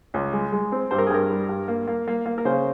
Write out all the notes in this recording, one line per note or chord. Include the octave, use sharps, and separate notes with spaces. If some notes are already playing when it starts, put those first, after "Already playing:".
C#2
G#3
G#3
C4
G2 C5
A#4
G#4
G2 A#4
G3
G2
A#3
A#3
A#3
A#3
A#4
C#3 C5